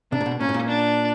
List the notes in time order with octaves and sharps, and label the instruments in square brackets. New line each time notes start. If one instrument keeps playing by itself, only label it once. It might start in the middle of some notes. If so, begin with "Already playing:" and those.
[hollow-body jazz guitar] C3 [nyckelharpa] D4
[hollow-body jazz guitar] A#2
B2
[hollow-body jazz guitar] A#2 [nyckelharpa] C#4
[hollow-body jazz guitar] A2
A#2
[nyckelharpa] D4